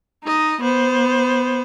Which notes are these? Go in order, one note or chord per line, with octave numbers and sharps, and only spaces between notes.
D#4 D#5
B3 C5